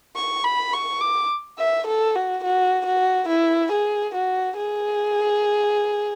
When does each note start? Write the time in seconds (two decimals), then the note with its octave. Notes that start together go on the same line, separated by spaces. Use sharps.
0.16 C#6
0.45 B5
0.73 C#6
1.01 D6
1.59 E5
1.87 A4
2.15 F#4
2.44 F#4
2.86 F#4
3.29 E4
3.72 G#4
4.15 F#4
4.57 G#4